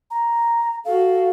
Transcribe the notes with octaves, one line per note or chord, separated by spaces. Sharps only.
A#5
F#4 A4 F5